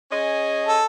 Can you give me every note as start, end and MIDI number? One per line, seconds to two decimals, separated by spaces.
0.10 0.80 61
0.10 0.80 68
0.10 0.80 75
0.67 0.86 69